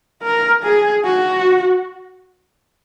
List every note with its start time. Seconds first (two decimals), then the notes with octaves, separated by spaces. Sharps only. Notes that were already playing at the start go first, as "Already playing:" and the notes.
0.23 A#4
0.63 G#4
1.04 F#4